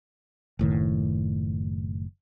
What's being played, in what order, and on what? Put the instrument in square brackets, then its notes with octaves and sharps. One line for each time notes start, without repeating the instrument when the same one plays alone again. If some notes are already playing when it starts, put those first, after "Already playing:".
[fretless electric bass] F#1 A2 D#3